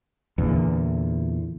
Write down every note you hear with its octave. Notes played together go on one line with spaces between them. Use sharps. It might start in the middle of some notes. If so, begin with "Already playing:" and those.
E2 A#2 D3